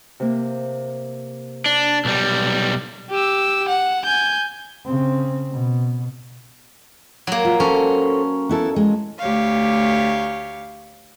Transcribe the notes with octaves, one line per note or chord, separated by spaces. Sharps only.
C3 A#3
D4
B1 G3
G4 E6
F#5
G#5 G6
C#3 C4
B2
F#3 A#3
F4
C#4 A4 C5
B3 E4 A4
G#3
D2 A3 G4 C#5 F5